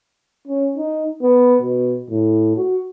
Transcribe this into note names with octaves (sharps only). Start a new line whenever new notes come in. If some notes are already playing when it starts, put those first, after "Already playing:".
C#4
D#4
B3
B2
A2
F#4